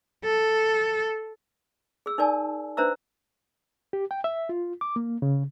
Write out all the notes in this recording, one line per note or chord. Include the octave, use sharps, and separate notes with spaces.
A4
G#4 E6
D#4 A#4 D5 G#5 A5
D4 B4 C5 E5 A#5 E6
G4
G5
E5
F4
D6
A#3
C#3